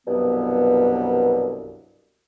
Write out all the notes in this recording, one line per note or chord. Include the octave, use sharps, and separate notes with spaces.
C2 G2 B2 F#3 B3